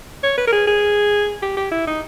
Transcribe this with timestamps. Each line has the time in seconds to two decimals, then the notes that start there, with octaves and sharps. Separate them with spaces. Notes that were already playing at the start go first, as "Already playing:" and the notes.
0.23 C#5
0.38 B4
0.47 A#4
0.52 G#4
0.67 G#4
1.42 G4
1.57 G4
1.72 E4
1.87 D#4